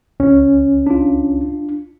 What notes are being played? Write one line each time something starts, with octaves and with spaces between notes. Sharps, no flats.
C#2 C#4
D4 F4